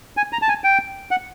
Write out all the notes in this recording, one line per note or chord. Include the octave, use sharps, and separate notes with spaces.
G#5
A#5
A5
G#5
G5
F#5